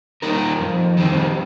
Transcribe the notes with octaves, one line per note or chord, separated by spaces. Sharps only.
G3 A#3 D#4 A#4
F2
D#3 G3 C4